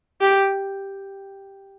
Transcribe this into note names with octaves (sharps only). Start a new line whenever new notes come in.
G4